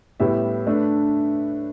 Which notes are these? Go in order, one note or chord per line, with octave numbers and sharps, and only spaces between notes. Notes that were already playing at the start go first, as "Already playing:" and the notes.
A2 G3 B3 G4 E5
A3 D4 B4